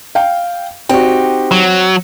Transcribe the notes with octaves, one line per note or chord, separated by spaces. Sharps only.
F5 G5
C4 D#4 F#4 G4
F#3